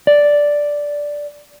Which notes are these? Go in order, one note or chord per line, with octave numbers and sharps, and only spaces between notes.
D5